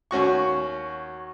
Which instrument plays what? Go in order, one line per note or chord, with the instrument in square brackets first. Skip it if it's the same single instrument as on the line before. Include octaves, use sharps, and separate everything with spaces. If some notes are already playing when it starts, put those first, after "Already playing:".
[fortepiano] D#2 C#4 F#4 C#6